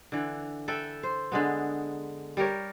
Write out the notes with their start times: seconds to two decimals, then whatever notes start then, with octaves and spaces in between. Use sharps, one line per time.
0.12 D3 E3
0.68 A4 B4 E5 G5
1.03 C5
1.32 D3 G#3 B3
2.37 G3 G4 A#4 C#5